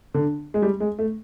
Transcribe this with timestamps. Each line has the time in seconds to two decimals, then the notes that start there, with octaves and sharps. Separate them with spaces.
0.14 D3
0.54 G#3
0.62 G3
0.80 G#3
0.99 A3